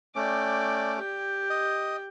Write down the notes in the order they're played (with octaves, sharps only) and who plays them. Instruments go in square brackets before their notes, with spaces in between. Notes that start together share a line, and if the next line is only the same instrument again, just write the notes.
[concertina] A3 C#4 D6 [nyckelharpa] D5 G5
[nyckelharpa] G4 G5
[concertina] D#5